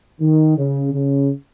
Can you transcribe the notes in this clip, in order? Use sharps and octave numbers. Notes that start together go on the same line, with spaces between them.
D#3
C#3
C#3